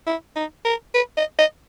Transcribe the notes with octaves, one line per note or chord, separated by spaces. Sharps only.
E4
D#4
A#4
B4
D#5
D#5